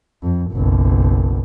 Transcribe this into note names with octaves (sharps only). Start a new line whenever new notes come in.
F2
F#1 B1